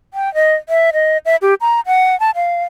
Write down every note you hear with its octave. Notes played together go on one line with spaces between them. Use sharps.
G5
D#5
E5
D#5
E5
G4
A#5
F#5
A5
F5